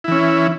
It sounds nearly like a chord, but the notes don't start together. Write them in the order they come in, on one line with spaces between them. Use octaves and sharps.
E4 E3 C#4